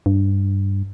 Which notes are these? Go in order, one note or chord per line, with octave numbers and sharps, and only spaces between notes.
G2